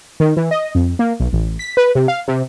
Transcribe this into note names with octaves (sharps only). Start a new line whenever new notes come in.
D#3
E3
D#5
F2
A#3
B1
A1
B6
B4
C3
F5
C3